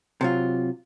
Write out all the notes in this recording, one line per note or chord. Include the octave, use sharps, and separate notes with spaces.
C3 F#3 F4